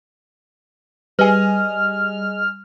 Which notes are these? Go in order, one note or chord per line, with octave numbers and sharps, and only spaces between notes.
G3 G#4 B4 D#5 G#5 F6